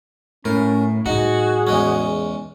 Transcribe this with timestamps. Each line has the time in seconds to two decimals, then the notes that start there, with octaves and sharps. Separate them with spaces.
0.45 A2 C#4 A#4
1.06 A2 G3 D#4 F#4 G#4
1.67 E2 G#3 C#4